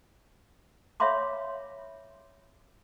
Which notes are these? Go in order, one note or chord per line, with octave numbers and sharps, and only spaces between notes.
C#5 E5 F5 B5 C6 D6